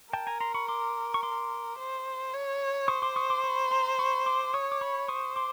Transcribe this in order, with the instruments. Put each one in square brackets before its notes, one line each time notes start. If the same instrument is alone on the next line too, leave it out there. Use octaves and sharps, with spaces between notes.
[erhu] A#4 [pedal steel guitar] G5 A5
[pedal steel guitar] G#5 A#5
A#5 C6
B5 C#6
C6 D6
C#6
C6 D6
[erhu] C5
C#5
[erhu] C5 [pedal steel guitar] C#6 D#6
[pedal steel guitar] C6 D6
C#6 D#6
C6 D6
B5 C#6
A#5 C6
B5 C#6
C6 D6
[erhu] C#5 [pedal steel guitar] C#6 D#6
[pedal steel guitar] D6
B5 C#6
[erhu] C5 [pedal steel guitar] C#6 D#6
[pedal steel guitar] C6 D6